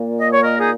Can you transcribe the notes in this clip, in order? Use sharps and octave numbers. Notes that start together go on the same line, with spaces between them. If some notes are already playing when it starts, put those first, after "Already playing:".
Already playing: A#2 A#3
D#5
C#5
A#4 D#5
D#4 G#4